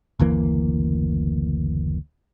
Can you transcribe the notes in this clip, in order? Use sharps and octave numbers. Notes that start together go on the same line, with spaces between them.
F#1 D2 E3 A#3